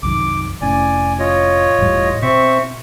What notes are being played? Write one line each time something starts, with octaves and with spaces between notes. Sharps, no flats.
C2 F#2 D#3 D6
F1 A2 C#4 D5 G#5
F4 C#5 D#5
E1 A2 G3
B2 C4 E5 C#6